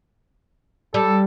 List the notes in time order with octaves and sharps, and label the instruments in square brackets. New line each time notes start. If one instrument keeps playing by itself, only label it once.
[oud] G3 [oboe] A4